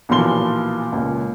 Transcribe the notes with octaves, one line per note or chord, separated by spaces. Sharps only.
B1 A#2 E3 F3 C6 G7
C#2 A#2